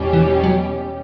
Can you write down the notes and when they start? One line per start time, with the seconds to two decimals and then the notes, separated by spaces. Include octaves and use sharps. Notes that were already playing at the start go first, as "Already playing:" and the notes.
Already playing: E2 B2 G3 C#4 G4
0.13 E3
0.44 F#3